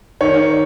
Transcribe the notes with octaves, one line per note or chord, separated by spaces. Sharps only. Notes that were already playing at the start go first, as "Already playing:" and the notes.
D#3 C#5